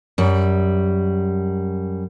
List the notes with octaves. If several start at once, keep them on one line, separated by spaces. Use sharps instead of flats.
F#2 G3